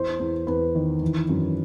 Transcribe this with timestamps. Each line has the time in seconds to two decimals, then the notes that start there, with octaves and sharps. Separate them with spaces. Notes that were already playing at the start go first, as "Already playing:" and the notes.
Already playing: E2 C5
0.19 E2
0.47 E2 B4
0.75 D#3
1.02 E3
1.29 F#2